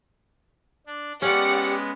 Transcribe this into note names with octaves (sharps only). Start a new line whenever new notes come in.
D4
G#3 B3 C#4 G4 D5 F#5 C#7